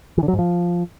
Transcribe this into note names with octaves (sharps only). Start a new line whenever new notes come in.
E3
D3
F#3
G#2
F3